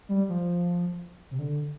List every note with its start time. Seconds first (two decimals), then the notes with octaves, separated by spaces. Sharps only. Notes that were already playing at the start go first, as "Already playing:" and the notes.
0.09 G3
0.29 F3
1.31 C3
1.39 D3